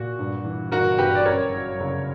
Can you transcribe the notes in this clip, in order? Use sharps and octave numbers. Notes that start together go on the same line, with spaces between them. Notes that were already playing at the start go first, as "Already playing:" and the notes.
Already playing: A#2 F#4
G2
E3
G1 F#4 A#4
G1 G4 B4
D5
F#2 A#4 C#5
F#3
F#1